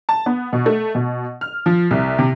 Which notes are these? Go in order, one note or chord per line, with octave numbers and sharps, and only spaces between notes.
A5
B3
B2
A3
B2
F6
F3
C2
C3